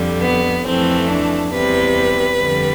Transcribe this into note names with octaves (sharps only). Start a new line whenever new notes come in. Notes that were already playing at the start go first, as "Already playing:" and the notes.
Already playing: F2 D3 G3
B3
F2 E3 A3 C4
D4
E2 C3 G3 B4
F2 D3 G3